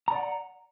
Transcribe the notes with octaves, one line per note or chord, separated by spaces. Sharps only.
D5 F#5 A#5